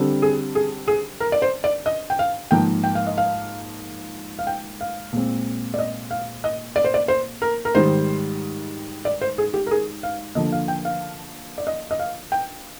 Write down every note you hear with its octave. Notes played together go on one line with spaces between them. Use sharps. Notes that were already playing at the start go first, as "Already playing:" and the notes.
Already playing: D3 G3 C4
G#4
G#4
G#4
A#4
D5
C5
D5
D#5
G5
F5
G#2 F3 A#3 G5
G5
F5
D#5
F5
F5
G5
F5
A#2 G#3 C4
D5
D#5
F5
D#5
D5
C5
D5
C5
A#4
A#4
G#2 D#3 G3 C5
D5
C5
G#4
G4
A#4
G#4
F5
D3 F3 A#3 D#5
F5
G5
F5
D5
D#5
D#5
F5
G5